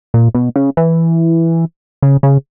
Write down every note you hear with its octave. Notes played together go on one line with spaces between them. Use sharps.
A#2
B2
C#3
E3
C#3
C#3